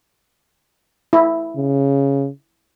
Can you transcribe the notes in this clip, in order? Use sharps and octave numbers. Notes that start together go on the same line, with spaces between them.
E4
C#3